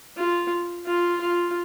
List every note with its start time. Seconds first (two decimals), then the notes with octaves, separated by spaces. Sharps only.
0.17 F4
0.87 F4
1.21 F4